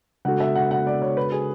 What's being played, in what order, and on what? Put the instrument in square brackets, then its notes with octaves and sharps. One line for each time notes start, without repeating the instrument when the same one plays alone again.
[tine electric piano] C#3 G#3 D4 F#4 A4 [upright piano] F#5
[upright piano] E5
F#5
F#5
D5
C#5
B4
G#4